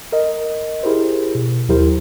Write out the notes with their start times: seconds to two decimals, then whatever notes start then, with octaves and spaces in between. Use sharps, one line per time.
0.12 A#4 D#5
0.83 E4 G4 G#4 A#4 C5
1.35 B2
1.69 D#2 F#3 E4 G4 A#4 C5